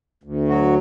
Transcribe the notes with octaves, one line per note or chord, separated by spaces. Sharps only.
D2
F#3 F#4